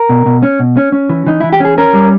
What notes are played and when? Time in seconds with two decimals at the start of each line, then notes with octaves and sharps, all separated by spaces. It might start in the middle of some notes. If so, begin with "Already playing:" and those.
Already playing: A#4
0.09 B2
0.26 B2
0.43 C#4
0.60 B2
0.77 C#4
0.92 C#4
1.10 E3
1.27 E3 D#4
1.40 E3 E4
1.53 G4
1.60 C#4 G#4
1.78 C#4 A#4
1.93 G3